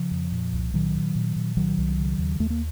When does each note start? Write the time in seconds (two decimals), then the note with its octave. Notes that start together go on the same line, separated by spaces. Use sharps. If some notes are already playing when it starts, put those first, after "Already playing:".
Already playing: C#3 F3
0.11 F2
0.32 A#2
0.53 C2
0.74 A#2 D#3 F#3
0.95 A#2
1.15 A#2
1.36 A#2
1.57 C2 D#3 F#3
1.78 C2
1.98 C#3
2.19 D#2
2.40 D#2 A3
2.50 A#3